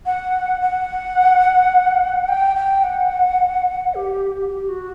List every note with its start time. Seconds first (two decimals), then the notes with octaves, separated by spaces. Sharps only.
0.06 F#5
0.61 F#5
2.28 G5
2.56 G5
2.83 F#5
3.95 G4
4.50 G4
4.69 F#4